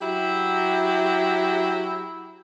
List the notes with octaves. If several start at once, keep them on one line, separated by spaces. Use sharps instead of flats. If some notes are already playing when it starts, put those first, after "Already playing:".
F#3 E4 G4